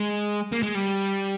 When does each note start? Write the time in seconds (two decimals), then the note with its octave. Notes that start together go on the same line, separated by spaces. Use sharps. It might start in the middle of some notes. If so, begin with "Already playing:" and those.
Already playing: G#3
0.52 A#3
0.63 G#3
0.75 G3